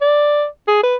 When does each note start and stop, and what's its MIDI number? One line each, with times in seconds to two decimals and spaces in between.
0.02 0.45 74
0.68 0.83 68
0.83 0.96 71